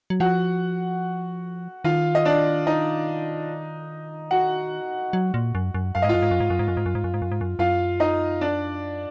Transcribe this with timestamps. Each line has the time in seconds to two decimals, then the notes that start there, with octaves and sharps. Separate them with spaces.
0.10 F#3
0.20 F3 F#4 F#5
1.84 D#3 F4 F5
2.15 D#5
2.25 D4 D5
2.67 D#4 D#5
4.31 F#4 F#5
5.13 F#3
5.34 A#2
5.55 F#2
5.74 F#2
5.95 F#2 F5
6.02 G#2 D#5
6.09 F#2 F4 F5
6.22 G#2
6.31 F#2
6.40 G#2
6.50 F#2
6.59 G#2
6.68 F#2
6.77 G#2
6.86 F#2
6.95 G#2
7.04 F#2
7.14 G#2
7.22 F#2
7.32 G#2
7.41 F#2
7.59 F#2 F4 F5
8.00 D#4 D#5
8.41 D4 D5